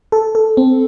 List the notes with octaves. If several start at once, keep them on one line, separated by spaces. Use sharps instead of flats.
A4
A4
C4